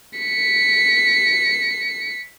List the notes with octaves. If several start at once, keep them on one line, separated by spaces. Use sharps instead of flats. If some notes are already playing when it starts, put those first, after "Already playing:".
B6 C#7